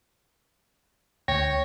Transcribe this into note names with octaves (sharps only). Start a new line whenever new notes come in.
D2 C#5 G5 A#6